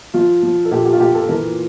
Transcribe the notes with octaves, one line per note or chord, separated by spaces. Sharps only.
F3 F4
F3
A4
A#2 G4
G4
F4
A#2 G4
A4
E3 A#4